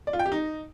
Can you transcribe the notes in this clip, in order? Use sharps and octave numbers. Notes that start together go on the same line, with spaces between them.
D5
F4
G5
G4
D#4